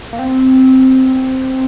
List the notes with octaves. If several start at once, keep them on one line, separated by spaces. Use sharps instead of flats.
A#3
C4